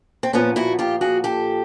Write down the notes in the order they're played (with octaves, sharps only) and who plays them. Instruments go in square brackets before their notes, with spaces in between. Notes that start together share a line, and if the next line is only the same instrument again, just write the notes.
[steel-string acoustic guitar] C4
A#2 F3 B3 C#4
E4 F#4
F4 G4
F#4 G#4
G4 A4